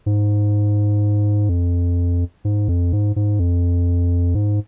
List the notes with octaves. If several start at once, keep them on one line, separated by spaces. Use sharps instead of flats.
G#2
F2
G#2
F2
G#2
G#2
F2
G#2